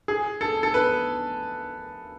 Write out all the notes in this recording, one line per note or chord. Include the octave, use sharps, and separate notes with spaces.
G#4
A4
A4
B4